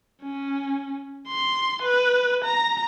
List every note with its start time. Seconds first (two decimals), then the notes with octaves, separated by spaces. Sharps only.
0.23 C#4
1.28 C6
1.83 B4
2.45 A#5